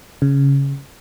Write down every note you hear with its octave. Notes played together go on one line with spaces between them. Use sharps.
C#3